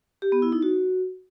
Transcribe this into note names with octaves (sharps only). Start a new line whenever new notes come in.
G4
B3
E4
D#4
F#4